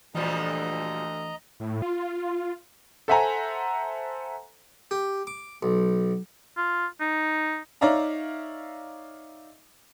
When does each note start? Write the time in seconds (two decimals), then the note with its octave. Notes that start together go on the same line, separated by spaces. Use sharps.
0.15 D2 A#2 E3 F3 G3 D#5 A#5
1.60 A2
1.82 F4
3.08 A4 C5 E5 F#5 G#5 A#5
4.91 G4
5.27 D6
5.63 B1
6.57 F4
7.01 D#4
7.81 D#4 C#5 D5 E5 F5 A#5